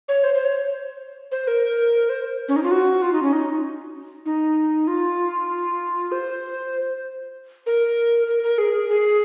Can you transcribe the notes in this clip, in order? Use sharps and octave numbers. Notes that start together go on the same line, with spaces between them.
C#5
C5
C5
C#5
C5
A#4
C5
C#4
D#4
F4
F#4
F4
D#4
C#4
D#4
D#4
F4
C5
A#4
A#4
A#4
G#4
G#4